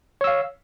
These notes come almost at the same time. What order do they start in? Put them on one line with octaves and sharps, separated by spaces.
C#5 E6 F5